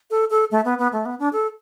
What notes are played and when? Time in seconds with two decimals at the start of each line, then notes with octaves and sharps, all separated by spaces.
0.11 A4
0.30 A4
0.51 A3
0.65 B3
0.78 B3
0.93 A3
1.05 B3
1.19 D4
1.33 A4